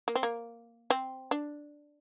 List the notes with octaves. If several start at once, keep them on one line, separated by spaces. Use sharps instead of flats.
A#3
C4
A#3
C4
D4